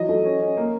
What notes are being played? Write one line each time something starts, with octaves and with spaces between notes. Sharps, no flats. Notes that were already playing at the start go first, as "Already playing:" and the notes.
Already playing: E3 F#3 D#5
A3
C#4
C#4
A#3